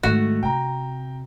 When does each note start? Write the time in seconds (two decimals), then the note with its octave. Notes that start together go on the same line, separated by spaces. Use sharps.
0.03 G#2 D#3 A3 F#4 E7
0.43 C3 G5 A#5